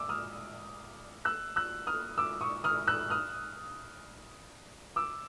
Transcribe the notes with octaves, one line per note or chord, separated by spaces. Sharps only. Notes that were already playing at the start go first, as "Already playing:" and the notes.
Already playing: D6 E6
D#6 F6
E6 F#6
E6 F#6
D#6 F6
D6 E6
C#6 D#6
D#6 F6
E6 F#6
D#6 F6
D6 E6